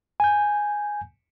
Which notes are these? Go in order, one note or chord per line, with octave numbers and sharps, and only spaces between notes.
G#5 G6